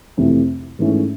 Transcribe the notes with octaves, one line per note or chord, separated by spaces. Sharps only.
F2 C3 E3 A3
G#2 E3 A3 C#4